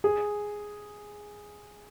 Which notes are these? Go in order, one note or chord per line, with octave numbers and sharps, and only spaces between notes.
G#4